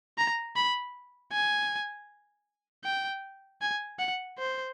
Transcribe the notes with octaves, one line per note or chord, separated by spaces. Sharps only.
A#5
B5
G#5
G5
G#5
F#5
C5